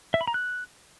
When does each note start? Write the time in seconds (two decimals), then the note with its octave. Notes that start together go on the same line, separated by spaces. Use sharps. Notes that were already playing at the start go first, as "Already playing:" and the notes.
0.14 E5
0.21 B5
0.28 A#5
0.34 F#6